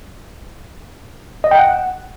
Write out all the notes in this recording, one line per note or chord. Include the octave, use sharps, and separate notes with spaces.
D#5
G5
F#5